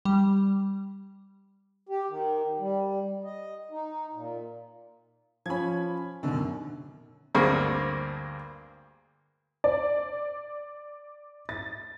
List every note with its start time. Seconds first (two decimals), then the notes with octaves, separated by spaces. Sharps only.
0.05 G3
1.89 G4
2.10 D#3
2.59 G3
3.25 D#5
3.71 D#4
4.14 A#2
5.46 F3 C#4 B5 G#6
6.23 F#2 B2 D3 D#3
7.35 D2 G2 A#3 C4 G#4 C#6
9.64 D5
11.49 A6